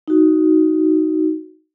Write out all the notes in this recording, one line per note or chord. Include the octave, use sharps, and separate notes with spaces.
D#4 F#4